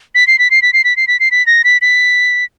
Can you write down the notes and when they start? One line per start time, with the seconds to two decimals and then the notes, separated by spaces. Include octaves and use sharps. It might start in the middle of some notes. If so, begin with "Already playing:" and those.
0.15 B6
0.27 C7
0.39 B6
0.51 C7
0.62 B6
0.73 C7
0.84 B6
0.97 C7
1.08 B6
1.20 C7
1.31 B6
1.47 A#6
1.64 B6
1.82 B6